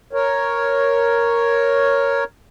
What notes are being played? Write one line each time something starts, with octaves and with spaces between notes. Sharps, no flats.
A#4 C#5